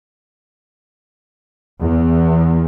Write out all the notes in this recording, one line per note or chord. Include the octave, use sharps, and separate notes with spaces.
E2